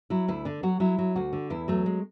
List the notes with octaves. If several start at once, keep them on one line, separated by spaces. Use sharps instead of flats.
F#3 E4
D2 E4
D3 D4
F#3 F#4
F#3 E4
F#3
D2 F#4
D3
E2 E4
F#3 A3
G#3